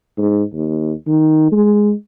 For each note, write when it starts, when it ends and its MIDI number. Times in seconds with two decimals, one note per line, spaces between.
0.18 0.43 44
0.53 0.92 39
1.07 1.49 51
1.52 1.93 56